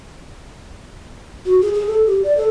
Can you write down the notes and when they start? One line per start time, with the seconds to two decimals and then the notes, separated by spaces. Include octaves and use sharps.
1.45 F#4
1.62 G#4
1.74 G#4
1.87 A4
2.06 G4
2.23 D5
2.37 A4